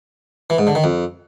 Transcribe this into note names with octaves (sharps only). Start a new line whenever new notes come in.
E3
G#2
D3
D#3
F2